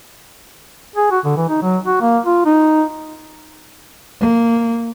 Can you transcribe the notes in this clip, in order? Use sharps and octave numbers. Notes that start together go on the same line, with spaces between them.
G#4
F#4
D3
E3
D#4
F#3
F#4
A#3
F4
D#4
A#3